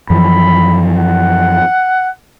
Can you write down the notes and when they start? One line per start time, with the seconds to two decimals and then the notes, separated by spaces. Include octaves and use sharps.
0.10 F#2 E3 F3 B5
0.97 F#5